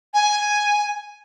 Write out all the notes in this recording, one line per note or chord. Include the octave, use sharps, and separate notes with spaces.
G#5